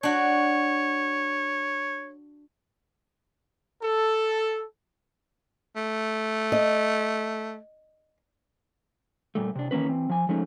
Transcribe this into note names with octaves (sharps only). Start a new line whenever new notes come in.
D4 F#4 C#5
A4
A3
D#5
A#2 G3 A3
C3 D4
D#3 E3 A#3 C#4 B4
E3 C4
F3 G#5
F3 G#3 A3 C#4 D#4